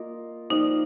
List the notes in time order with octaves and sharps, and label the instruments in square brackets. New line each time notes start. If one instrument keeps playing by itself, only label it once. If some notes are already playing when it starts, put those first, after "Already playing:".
Already playing: [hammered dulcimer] A#3 F4 A#4 D#5
[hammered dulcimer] F3 A#3 G4 D#5 [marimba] D#4